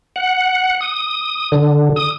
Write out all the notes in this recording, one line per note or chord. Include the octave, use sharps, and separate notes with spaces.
F#5
D#6
D3
D#6